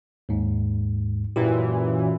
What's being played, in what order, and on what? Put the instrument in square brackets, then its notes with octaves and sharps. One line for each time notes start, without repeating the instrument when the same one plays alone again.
[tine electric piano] D#2 G#2
[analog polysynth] F#2 A#2 E3 [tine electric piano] G4